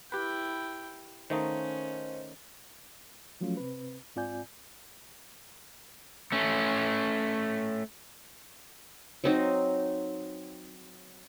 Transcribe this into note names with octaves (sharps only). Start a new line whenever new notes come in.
E4 G4 B4 G5
D#3 A3 C#4 D#4 C5 D#5 F5
F3 F#3 A3 C#4 F4
C3 C4 B4
G#2 C4 F4 D5 G#5 G6
A3 C#4
F#3 C4 D#4